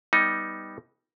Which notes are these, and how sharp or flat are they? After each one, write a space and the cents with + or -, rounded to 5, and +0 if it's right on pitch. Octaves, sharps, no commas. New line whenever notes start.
G3 +0 B3 +0 D#4 +10